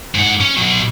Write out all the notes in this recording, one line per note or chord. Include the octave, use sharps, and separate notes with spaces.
G#2 F#5
C#4
B2 F#3